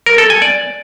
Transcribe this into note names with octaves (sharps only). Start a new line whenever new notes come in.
A#4
A4
G#5
D5